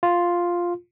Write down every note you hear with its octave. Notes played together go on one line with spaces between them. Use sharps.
F4